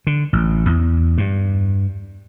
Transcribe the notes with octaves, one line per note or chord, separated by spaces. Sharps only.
D3
A1
E2
G2